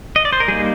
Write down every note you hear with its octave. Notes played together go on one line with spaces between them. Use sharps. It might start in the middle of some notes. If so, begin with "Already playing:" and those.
D#5
D5
C5
A#4
G3 A#3 D#4 G#4